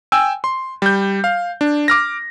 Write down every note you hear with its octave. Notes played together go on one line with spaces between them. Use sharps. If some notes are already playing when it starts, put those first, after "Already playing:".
G5 G#5 E6
C6
G3 G6
F5
D4
D6 F6 A#6